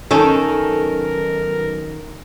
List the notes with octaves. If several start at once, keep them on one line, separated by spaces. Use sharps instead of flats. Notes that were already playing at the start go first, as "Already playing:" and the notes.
B1 D#3 C#4 A4 A#4